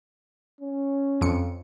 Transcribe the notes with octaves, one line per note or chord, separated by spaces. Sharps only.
C#4
F2 C#7